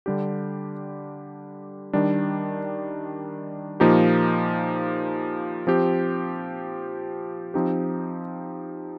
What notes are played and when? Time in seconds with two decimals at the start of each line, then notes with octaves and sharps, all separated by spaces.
0.06 D3 G3 D4 G4
1.93 D#3 G3 D4
3.80 A#2 F3 A#3 D#4 G4
5.67 F3 C4 G4
7.54 F3 C4 D#4 G4